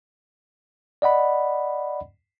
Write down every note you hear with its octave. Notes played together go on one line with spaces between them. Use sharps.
D5 D#5 F#5 B5